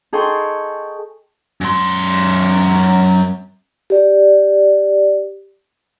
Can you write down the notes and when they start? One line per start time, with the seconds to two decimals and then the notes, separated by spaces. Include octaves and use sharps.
0.13 D#4 G#4 A4 G5 C6 C#6
1.61 F#2 C6
3.90 G4 D5